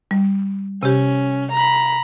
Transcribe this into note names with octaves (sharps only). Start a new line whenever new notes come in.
G3
C3 C#4 G4
A#5 B5